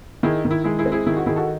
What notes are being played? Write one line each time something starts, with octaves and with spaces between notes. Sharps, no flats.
D#3 E4 G#4
D#3
E4
G#3 E4 G#4
E4 G#4
C4
E4 G#4
D#3 E4
G#4
F#4
D#3 E4 G#4
F#4 A4